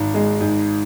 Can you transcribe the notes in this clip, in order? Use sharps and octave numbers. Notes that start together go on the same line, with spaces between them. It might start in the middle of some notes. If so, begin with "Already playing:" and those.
Already playing: G#1 G#2
G#3
G#2